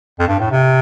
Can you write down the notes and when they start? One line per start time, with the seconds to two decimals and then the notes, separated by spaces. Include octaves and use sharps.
0.20 F2
0.28 G2
0.39 A2
0.51 C3